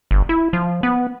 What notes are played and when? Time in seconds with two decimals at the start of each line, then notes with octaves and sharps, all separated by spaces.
0.11 G1
0.29 E4
0.53 F3
0.83 B3